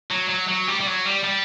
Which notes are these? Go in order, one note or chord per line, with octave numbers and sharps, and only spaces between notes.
F#3
F#3
F#3
G3
G3
F#3
G3
G3